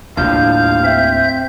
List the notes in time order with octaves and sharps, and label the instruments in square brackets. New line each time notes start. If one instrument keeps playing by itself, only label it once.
[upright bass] D#2 A2 [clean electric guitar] D3 F3 G3 [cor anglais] F5 [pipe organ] G6
[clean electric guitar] C4 [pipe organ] E5 G6